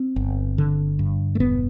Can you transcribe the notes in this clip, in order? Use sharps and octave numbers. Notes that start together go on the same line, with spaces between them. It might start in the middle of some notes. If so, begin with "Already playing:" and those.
Already playing: C4
G1
D3
G2
A3
E1 B3